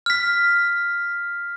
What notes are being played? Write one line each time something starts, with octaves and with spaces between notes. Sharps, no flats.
F6 B6